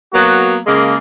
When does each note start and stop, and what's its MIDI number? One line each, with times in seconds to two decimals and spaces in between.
0.13 0.57 54
0.13 0.57 58
0.13 0.57 59
0.13 0.57 66
0.67 0.96 49
0.67 0.96 56
0.67 0.96 58